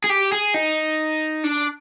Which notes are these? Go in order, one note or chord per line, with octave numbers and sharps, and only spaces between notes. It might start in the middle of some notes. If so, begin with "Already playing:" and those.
G#4
G4
G#4
D#4
D4